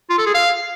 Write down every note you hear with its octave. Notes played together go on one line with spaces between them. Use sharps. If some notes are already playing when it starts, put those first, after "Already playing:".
F4
A4
G#4
F5